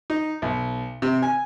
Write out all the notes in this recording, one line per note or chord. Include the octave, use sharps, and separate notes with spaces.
D#4
B1
C3
G#5